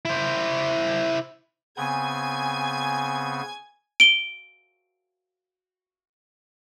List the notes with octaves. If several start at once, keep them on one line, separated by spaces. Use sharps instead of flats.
E4 C5
C#3 B3 C4 G#5 G#6
D7 G7